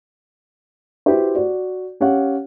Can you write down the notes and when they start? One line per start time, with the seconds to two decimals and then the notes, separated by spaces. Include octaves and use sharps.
1.06 E4 F#4 G4 B4 C5
1.35 F#4 D5
2.00 C#4 G4 C#5 F5 F#5